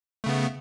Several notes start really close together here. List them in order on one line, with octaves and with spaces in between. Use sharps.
A3 C#3 B3